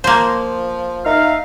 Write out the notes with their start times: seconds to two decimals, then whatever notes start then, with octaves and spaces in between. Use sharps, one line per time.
0.04 F3 A#3 C5
1.05 D#4 E5 F5